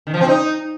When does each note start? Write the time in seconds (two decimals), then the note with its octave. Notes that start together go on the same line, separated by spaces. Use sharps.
0.07 D#3
0.14 F3
0.21 C4
0.28 D#4